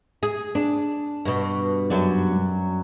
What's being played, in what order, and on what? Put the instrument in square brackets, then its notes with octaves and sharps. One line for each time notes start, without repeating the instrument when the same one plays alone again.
[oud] G#4
[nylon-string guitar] D4
[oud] G2 B2
[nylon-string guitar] F#2 F#3 D5